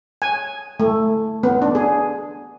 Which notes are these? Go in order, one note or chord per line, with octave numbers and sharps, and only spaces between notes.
G#5
A3
B3
D4
G#4